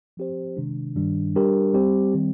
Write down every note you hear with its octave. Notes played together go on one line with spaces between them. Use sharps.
F3 C4 G4 C5
C3 D#3 G#3 D4
G2 D#3 G3 D4
G3 D4 G4 A#4
G3 C4 G4 C5
D#3 G3 C4